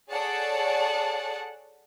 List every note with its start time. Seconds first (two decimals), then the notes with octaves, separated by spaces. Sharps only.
0.11 G#4 A4 C#5 D5 F#5 A5